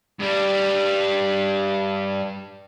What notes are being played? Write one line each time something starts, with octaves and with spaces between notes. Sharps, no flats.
G2 G3